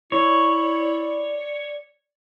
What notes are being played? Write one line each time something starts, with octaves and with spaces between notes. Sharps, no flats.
E4 C#5 D5